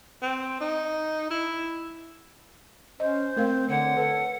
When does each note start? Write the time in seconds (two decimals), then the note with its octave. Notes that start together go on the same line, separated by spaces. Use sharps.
0.22 C4
0.60 D#4
1.30 E4
3.00 C#4 C5 D#5
3.36 A3 C4 A#4 F5
3.70 D3 C#5 F#5
3.97 A4 B4